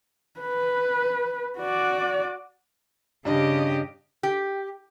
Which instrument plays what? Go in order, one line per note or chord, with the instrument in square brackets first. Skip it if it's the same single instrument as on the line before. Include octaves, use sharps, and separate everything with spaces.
[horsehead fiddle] B4
F#4 D5
[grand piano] G2 [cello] C#3 G4 [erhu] D#5
[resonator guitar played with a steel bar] G4